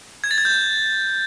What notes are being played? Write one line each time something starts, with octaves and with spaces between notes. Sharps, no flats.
G#6
A6
G#6
G6